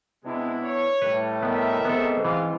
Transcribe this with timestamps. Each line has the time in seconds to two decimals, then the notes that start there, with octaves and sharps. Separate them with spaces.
0.25 C3 G#3 B3 D4 E4
0.63 C#5
1.02 A2 G3 A3 B4
1.43 B3 A#4 D#5 E5
1.85 G#2 B3 C4 A4
2.25 C#2 E3 G#3 F4